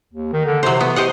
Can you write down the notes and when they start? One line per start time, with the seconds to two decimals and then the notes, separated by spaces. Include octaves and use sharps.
0.13 D#2
0.33 D#3
0.45 D3
0.63 C3 F#3 C5
0.80 B3
0.96 G4 C5 D#5 F#5